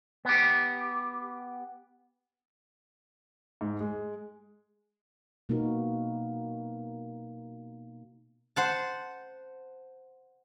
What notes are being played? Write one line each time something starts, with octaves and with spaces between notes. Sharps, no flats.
B3 G4
G#2
G#3
B2 A#3 B3 D#4 F#4 A#4
C5 F#5 A5